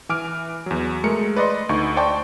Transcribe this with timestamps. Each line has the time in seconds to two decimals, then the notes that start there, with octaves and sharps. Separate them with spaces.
0.09 E3 G#5 D6 F6 D7
0.66 E2 F#3
1.04 G#3 A3 A#4 C#7
1.36 B4 D5 D#5 C6
1.69 D2 D#4 C#6
1.97 C5 D5 G5 A5 C#6